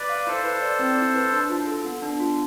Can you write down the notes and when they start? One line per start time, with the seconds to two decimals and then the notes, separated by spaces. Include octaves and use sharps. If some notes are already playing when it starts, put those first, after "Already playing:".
Already playing: B4 D5
0.09 F5
0.27 E4 A4 C5
0.45 B4
0.62 D5
0.79 C4
0.97 E4
1.15 B4
1.32 D4
1.50 F4
1.67 A4
1.85 B3
2.02 D4
2.20 F4